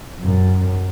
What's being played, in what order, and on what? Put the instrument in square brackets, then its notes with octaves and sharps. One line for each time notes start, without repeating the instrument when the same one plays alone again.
[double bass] F#2